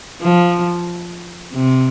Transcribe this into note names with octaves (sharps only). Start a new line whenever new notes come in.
F3
C3